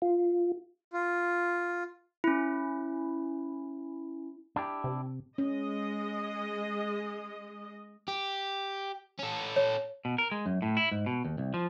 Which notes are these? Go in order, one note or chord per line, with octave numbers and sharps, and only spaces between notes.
F4
F4
C#4 E4
D4 E4 G4
C3
G#3 C#4 D#5
G4
C#4 A4
C#5
B2
A#4
G#3
F#2
A2
E4
G#2
B2
D#2
C2
F3